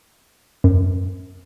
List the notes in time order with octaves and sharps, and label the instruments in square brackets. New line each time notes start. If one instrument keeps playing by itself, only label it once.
[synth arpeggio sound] F#2